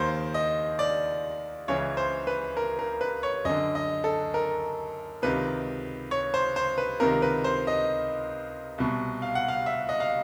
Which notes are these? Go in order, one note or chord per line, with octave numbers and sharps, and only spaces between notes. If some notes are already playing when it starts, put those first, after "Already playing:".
Already playing: D#2 D#3 C5
D#5
D5
C#2 C#3 E3 C#5
C5
B4
A#4
A#4
B4
C#5
F#2 D3 D#5
D#5
A4
A#4
C#2 C3 D#3 B4
C#5
C5
C5
B4
C#2 C3 D#3 A#4
B4
C5
D#5
C2 B2
F5
F#5
F5
E5
D#5
F5